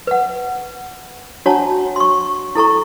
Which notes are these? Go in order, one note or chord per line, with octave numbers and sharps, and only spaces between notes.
B4 F#5
D4 F#4 C#5 F#5 A5 A#5
C6 C#6
E4 A4 A#5 C#6